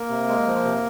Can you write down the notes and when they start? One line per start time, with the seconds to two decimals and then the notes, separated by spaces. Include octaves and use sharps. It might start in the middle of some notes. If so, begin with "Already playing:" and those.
Already playing: A#3 A#4
0.09 C3
0.29 G#3
0.46 F3
0.65 C3